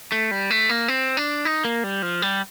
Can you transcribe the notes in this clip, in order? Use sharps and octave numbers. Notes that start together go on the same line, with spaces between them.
A3
G3
A3
A#3
C4
D4
D#4
A#3
G3
F3
G3